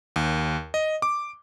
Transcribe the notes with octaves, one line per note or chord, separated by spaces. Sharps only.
D#2
D#5
D6